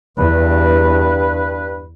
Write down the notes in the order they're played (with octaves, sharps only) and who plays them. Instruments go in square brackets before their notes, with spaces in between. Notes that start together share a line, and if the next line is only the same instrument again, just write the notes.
[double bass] E2 [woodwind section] G2 B4